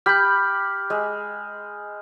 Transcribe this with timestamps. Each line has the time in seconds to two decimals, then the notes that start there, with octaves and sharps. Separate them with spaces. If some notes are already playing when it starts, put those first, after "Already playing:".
0.06 G4 B5 F6 G6
0.90 G#3